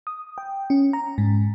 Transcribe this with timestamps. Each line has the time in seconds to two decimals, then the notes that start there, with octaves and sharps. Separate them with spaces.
0.07 D#6
0.38 G5
0.70 C#4
0.93 A#5
1.18 G#2